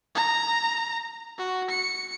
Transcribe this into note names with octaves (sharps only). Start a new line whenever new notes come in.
A#5
F#4
C#7